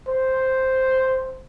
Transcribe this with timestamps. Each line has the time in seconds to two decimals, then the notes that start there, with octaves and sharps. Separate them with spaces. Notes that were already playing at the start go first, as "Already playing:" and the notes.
0.09 C5